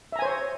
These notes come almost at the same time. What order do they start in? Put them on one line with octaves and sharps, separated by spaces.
E5 A#5 G#5 C5 C#5